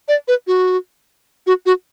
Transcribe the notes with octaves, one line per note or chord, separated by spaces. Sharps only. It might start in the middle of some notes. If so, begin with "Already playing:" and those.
D5
B4
F#4
F#4
F#4